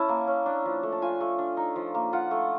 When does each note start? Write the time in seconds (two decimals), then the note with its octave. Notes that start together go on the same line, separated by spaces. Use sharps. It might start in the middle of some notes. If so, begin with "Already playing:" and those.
Already playing: C#4 E4 A5
0.09 A#3
0.28 C#4
0.46 D4
0.65 F3
0.83 A3
0.92 A5
1.02 F4 G#5
1.21 A3
1.39 D4
1.57 D#4
1.76 F3
1.95 A#3
2.13 F4 F#5
2.31 A3